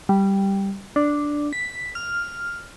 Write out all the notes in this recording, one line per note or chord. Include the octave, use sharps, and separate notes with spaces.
G3
D4
B6
F6